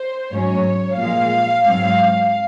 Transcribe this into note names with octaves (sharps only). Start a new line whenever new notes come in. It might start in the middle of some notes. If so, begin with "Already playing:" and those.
Already playing: C5
G#2 F#3 C#4 C#5
A#2 F3 G#3 F5
G#2 F#3 C4